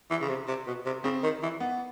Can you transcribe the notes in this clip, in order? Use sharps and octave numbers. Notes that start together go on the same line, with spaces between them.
E3
C#3
C3
C3
B2
C3
C#3 C4
D#3
E3
B3